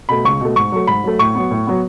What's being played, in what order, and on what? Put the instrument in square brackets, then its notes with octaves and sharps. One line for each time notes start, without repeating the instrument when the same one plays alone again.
[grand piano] B2 A3 B5
C#2 C#6
B2 A3
G#2 C#6
F#3 A3
G#2 B5
F#3 A3
A2 C#6
F#3 B3
A2
F#3 B3